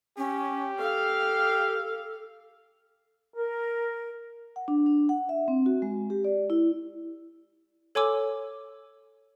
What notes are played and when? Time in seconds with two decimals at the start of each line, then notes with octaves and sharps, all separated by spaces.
0.18 C#4 G4
0.79 A4 F5
3.36 A#4
4.56 F#5
4.68 D4
4.86 D4
5.09 F#5
5.29 E5
5.48 C4
5.66 F#4
5.82 G#3
6.10 G4
6.24 D5
6.50 E4
7.95 A4 C#5 G#5 C6 D6 E6